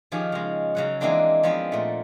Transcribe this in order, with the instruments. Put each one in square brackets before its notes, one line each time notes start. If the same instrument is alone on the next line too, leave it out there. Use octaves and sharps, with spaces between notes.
[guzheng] D#3 F3 C#4 G4 G#4
C#3 G#3
C#3 F#3 F#5
E3 G#3 A#3 C4 D4 D#4
F3 G#3 B3 C4
A#2 A3